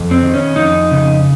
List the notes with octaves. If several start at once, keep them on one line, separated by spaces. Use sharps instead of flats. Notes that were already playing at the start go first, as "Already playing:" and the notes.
Already playing: F2
C4
D#3
C#4
F2 D#4
C#3